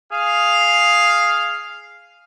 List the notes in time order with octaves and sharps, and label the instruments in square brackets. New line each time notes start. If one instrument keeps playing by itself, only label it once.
[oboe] G#4 [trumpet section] F5